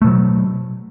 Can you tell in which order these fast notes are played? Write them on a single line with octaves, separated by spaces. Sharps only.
A3 B2 F#3